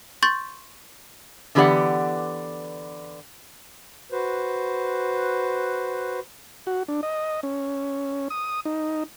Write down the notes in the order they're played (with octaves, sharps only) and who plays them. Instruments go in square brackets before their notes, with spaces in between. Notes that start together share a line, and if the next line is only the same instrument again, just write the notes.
[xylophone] C6 C#6 G6 A6
[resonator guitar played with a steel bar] D3 E3 B3 G4 D5 F#5
[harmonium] F#4 B4 C5
[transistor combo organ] F#4
D4
D#5
C#4
D#6
D#4